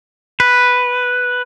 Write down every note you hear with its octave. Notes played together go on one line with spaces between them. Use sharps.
B4